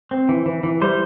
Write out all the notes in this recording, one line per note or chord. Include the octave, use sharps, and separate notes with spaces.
C4
E3
E3
E3
G3 C5